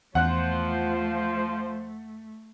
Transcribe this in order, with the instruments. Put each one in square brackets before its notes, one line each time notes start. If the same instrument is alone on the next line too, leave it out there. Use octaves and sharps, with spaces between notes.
[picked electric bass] E2 [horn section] F3 C5 [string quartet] A3 [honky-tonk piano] F#5 F#6